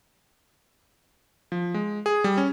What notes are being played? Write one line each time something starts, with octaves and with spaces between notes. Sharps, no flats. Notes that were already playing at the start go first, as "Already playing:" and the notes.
F3
G#3
G#4
G3
C#4